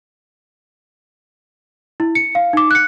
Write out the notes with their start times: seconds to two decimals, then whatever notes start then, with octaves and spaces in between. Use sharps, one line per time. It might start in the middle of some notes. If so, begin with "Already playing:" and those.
2.00 E4
2.15 C#7
2.35 F5
2.53 D#4 D6
2.71 F#6 C#7